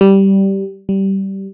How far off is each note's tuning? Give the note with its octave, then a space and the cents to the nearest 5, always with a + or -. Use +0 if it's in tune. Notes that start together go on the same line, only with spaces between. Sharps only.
G3 -10
G3 -15